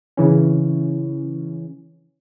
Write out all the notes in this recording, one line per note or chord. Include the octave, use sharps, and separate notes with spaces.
C#3 E3 C#4